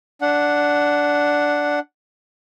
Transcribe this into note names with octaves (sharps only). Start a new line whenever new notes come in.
D4 F#5